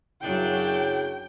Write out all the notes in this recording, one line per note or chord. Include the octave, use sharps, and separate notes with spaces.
F#2 C#3 F#3 D4 E4 G5